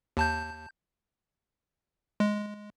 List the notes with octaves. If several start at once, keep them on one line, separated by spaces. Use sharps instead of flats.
D#2 A5 G6
G#3